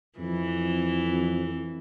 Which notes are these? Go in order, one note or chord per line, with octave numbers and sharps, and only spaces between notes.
F2 E3